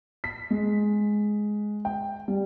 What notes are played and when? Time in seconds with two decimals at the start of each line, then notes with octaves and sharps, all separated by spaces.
0.24 B6
0.50 G#3
1.85 G5
2.28 G3